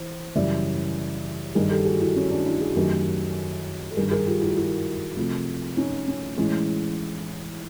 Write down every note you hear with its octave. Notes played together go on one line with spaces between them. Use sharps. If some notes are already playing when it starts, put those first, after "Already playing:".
Already playing: E3 C5
F#2 C#3 E3 G3 D5 E5
G2 D#3 G3 G#4 A#4
G4 A4
F#4 G#4
E4 F#4
C#4
D4
D4 E4
F#4 G#4
F#2 D#3 F#3 A3 G4 A4
A4
G2 D#3 G3 G#4 A#4
G#4 A#4
F4 G4
E4 F#4
E4 F#4
C3 F3 A3
C#4 D#4
C#4
A2 E3 G#3 C#4